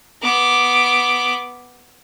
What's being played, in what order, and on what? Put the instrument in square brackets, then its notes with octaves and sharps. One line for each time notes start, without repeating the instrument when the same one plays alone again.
[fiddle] B3 D6